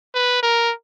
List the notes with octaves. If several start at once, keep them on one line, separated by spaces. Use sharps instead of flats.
B4
A#4